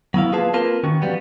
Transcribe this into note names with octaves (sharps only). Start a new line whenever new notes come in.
F#3 B3 E4 F5
A#3 F4 G#4 B4 F5 A5
A#3 C4 F4 A#4 B4 A5
D#3 C#4 F#4
F3 G3 B3